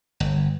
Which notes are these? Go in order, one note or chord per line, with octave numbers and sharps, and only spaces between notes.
G1